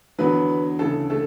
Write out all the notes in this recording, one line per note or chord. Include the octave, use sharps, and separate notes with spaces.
E2 D3 F#3 B3 B4
D2 C#3 E3 A3 A4
A3 A4